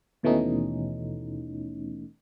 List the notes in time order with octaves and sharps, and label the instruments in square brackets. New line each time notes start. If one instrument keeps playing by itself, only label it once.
[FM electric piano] D#2 B2 E3 A3 C#4 D#4